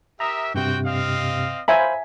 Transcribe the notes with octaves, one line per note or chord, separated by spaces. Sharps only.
G4 A#4 E5 A#5 D#6
G2 C3 C4 F#4 G5
C4 D#5 F5
C5 E5 F5 G#5 A#5 B5